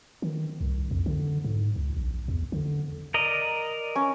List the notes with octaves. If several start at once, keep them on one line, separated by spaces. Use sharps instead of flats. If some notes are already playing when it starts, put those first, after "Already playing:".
D#3
C2
F2
D3
G#2
C#2
A#1
E2
D3
A#4 D5 D#5
C#4